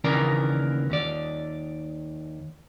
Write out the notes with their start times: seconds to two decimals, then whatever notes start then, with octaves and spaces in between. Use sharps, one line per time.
0.04 D#2 C#3 E3 A#3 A#4 D5
0.90 D#2 D5